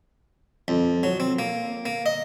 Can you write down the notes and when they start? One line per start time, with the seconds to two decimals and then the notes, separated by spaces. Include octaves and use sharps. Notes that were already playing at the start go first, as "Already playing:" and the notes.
0.68 F2
1.03 F#3
1.20 C4
1.39 A#3
1.86 A#3
2.06 D#5